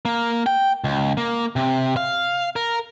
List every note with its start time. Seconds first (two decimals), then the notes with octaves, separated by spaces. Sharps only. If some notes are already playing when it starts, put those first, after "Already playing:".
0.05 A#3
0.46 G5
0.84 C#2
1.17 A#3
1.56 C3
1.97 F5
2.56 A#4